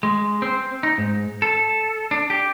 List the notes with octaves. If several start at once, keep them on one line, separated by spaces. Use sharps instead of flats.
G#3
C4
D#4
G#2
A4
D4
G4